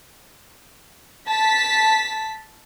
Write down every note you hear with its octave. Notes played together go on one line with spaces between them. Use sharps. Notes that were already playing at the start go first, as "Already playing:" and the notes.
A5 B6